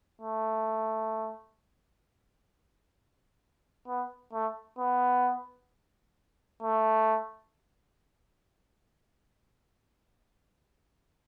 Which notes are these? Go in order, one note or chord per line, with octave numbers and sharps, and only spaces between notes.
A3
B3
A3
B3
A3